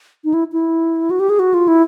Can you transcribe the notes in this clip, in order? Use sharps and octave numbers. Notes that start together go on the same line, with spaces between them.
D#4
E4
E4
F#4
G4
G#4
F#4
F4
E4